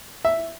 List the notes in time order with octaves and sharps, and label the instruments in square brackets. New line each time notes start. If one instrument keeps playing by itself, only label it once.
[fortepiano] E5